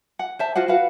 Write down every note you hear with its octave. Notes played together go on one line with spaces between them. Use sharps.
F#5
C5 E5 A5
F4 F#4 C5 F#5
F#4 B4 F5 F#5